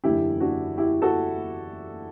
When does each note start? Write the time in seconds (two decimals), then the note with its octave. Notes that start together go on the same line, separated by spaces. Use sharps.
0.04 F#1 E2 D3 E4 G4
0.40 D4 F#4
0.77 E4 G4
1.02 F#4 A4